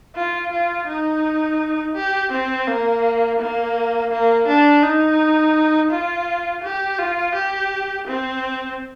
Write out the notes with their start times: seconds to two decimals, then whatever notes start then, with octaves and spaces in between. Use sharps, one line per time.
0.15 F4
0.51 F4
0.87 D#4
1.95 G4
2.31 C4
2.67 A#3
3.39 A#3
4.11 A#3
4.47 D4
4.83 D#4
5.90 F4
6.63 G4
6.98 F4
7.34 G4
8.07 C4